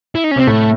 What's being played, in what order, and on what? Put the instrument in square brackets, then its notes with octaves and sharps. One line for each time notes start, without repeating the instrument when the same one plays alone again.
[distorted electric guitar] E4
D#4
C#4
[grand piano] C3 [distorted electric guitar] C4
[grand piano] A2 [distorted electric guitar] A3